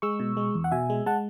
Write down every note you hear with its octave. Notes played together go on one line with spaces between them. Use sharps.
G#3 C#6 E6
B2
G#3
E2
F#5
B2 E5 G#5
G#3
G#3 F#5 A5